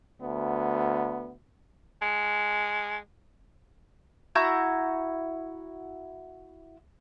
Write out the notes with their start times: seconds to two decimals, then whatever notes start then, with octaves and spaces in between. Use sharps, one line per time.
0.22 D2 B3
2.02 G#3
4.35 E4 F#4 A#5 G6